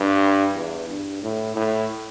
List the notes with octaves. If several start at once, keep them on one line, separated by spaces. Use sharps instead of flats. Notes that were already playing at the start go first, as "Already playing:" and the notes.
Already playing: G2
E2
G2
A2
A2